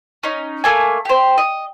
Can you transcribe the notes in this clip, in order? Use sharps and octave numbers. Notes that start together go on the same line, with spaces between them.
C#4 D#4
A3 A#3 G#5
G4 C5
D#5